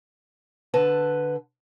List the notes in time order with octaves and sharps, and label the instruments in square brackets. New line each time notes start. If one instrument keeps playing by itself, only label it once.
[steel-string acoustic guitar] D3 B4 A5